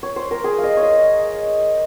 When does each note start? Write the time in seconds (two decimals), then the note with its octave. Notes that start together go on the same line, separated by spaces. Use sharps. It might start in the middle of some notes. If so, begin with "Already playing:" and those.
0.03 C#5
0.16 C5
0.31 A#4
0.44 G#4
0.58 F5
0.63 D#5
0.77 C#5
0.83 D#5